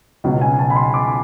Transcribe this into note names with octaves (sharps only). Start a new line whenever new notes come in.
C#2 B2 F#3
G#5
A5
B5
C6
D6